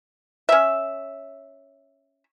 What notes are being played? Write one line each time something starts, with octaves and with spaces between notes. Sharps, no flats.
C#4 E5